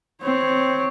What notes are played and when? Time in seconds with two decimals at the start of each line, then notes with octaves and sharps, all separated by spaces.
0.23 C4 C#5